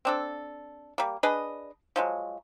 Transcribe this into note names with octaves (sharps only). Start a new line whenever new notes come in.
C4 D4 A4
G3 A#3
D4 G#4 B4 D#5
F3 F#3 G#3